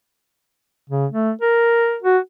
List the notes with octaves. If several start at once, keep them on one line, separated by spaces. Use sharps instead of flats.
C#3
A3
A#4
F#4